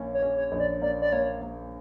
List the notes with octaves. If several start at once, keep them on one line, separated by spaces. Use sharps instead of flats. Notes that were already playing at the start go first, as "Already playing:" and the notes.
Already playing: A#1 A#3 C#4
C#5
C#4
C#5
A#1
D5
A#3 D5
D5
A#3 C#5
A#3